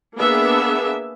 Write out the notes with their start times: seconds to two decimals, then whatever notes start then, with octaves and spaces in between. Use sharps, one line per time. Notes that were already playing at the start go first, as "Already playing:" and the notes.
0.16 A#3 B3 D4 G#4 E5